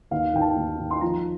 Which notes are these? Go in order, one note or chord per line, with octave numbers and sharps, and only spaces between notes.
D#2 F5
D#3 G5
A5
D#2
D#3
C6
F3 A#5